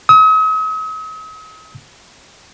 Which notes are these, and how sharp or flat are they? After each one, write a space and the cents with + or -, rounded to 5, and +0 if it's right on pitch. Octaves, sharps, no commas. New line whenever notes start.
D#6 +45